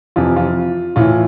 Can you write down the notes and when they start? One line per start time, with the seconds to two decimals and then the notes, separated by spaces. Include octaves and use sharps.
0.16 F2 C3 E3 F4
0.36 F4
0.96 A2 E3 F4